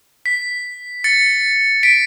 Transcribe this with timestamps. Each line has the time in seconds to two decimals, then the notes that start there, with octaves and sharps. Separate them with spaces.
0.26 B6
1.04 A6 C#7
1.83 B6 D7